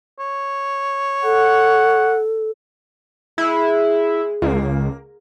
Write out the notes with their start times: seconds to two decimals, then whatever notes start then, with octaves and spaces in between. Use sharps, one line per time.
0.20 C#5
1.24 A4 F#5
3.38 G#3 E4
4.42 C#2 A#3